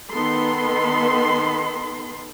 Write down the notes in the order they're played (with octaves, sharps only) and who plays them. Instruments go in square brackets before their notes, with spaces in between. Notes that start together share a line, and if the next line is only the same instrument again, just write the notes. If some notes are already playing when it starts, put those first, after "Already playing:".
[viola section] D#3 B3 D#4 A4 B5 C6